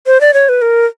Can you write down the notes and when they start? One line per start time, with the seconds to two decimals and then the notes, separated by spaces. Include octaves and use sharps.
0.07 C5
0.21 D5
0.34 C#5
0.49 B4
0.62 A#4